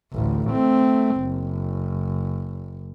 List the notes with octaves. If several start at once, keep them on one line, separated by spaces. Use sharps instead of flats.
A1 D2
A3 C4
F#1